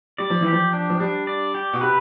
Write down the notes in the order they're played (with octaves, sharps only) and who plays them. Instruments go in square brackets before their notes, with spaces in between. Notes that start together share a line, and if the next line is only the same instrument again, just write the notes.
[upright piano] G3 [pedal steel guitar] D5
[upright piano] F3
E3
[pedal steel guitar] G4
[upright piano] F3
[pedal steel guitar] D4
[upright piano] F3
[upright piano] G3 [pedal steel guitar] D4
[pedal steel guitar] D5
G4
[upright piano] B2
[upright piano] C3 [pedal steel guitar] B4